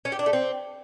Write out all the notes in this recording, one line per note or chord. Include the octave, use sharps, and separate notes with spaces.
C#4
G4
D4
A3
C4